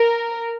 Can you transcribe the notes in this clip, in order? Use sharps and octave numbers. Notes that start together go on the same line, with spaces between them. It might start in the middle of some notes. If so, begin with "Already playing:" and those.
Already playing: A#4